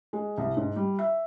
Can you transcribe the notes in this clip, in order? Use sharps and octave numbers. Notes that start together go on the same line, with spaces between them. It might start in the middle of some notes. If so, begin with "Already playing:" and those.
G#3
C2
G#2
G3
E5